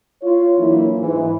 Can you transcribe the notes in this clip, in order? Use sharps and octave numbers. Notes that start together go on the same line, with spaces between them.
F4 C#5
E3 F#3 A#3 D4 E4
G#2 E3